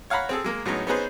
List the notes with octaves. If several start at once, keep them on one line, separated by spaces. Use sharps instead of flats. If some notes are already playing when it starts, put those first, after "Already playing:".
C#5 F5 F#5 A#5 B5
C4 G#4 A4
G#3 A#3 A#4
A2 F#3 G#3 B3 C#4 D#4
B3 C#4 D#4 G#4 B4 C5